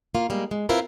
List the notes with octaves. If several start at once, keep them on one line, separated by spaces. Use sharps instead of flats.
A#3 F4
G3 G#3 A#3
G#3
C4 E4 F4 A#4 B4